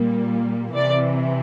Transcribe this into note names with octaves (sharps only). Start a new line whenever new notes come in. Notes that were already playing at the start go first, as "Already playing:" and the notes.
Already playing: A#2 G3 A#3
C3 E3 D5